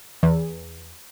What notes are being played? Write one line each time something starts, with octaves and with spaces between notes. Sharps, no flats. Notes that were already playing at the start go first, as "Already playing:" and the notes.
E2